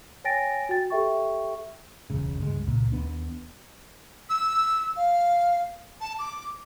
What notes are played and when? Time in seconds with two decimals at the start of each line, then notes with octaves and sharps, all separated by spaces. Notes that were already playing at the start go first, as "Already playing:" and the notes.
0.24 C#5 G5 G#5 A6 A#6 D7
0.69 F#4 G5 A6
0.90 G4 A4 E5 G5 C#6
2.10 E1 C#2 C#3
2.39 G1 C#2 G#3
2.67 C#2 A#2
2.92 D#2 B3 D4
4.29 E6
4.96 F5
6.00 A5
6.18 D6